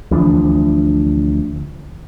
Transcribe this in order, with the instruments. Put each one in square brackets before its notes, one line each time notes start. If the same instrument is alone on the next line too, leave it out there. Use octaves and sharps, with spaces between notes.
[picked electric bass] D2 E3 F3 D4